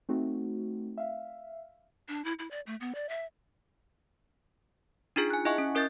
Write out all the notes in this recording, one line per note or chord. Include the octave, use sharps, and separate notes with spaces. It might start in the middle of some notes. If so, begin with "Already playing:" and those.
A3 C4 D#4 F#4
E5 F5
D4
E4
E4
D5
A3
B3
D5
E5
D4 D#4 F4 G#4
G#5 F#6
E4 D#5 E5 F#5 G#5 C#6
C#4
C#4 A#4 D#5 G6 A6